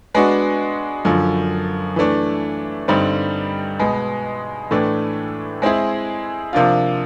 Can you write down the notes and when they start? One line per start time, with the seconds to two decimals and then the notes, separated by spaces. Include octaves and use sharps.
0.14 G#3 B3 D4 F#4
1.05 F#2 D3 F3
1.96 E3 A3 D4
2.88 G2 D3 G3 C4 D#4
3.79 B2 G#3 B3
4.71 A2 E3 A3 D4
5.62 G#3 C4 E4 G#4
6.53 C3 F3 A#3 D4 F4